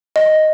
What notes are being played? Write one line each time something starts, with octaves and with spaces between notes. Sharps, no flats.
D#5